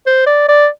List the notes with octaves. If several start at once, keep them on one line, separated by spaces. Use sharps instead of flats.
C5
D5
D5